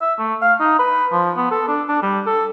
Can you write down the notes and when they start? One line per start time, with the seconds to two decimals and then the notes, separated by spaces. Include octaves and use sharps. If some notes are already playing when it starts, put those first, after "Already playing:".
0.02 E5
0.19 A3
0.42 F5
0.60 D#4
0.79 B4
1.12 F3
1.37 B3
1.51 A4
1.68 D4
1.89 D4
2.02 G3
2.26 A4